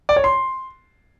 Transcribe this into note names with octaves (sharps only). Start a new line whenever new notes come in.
D5
C#5
C6